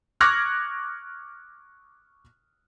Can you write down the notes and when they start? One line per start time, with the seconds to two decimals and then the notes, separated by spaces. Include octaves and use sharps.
0.21 C#6 D6 F6 F#6 G#6 A#6